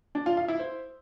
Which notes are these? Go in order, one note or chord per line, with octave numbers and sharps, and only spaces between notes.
D4
F4
F5
E4
C5